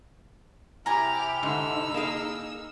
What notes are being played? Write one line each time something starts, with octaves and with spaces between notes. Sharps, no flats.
C3 E4 G4 G#5 A#5 F6 F7
G#2 D3 D#4 E6
A#3 G#4